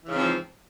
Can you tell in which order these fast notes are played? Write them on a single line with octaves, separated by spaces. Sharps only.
E3 C#3 G#2 C4 F3